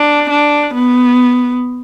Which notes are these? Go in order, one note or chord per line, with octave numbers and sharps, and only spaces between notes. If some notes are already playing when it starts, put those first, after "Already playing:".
Already playing: D4
D4
B3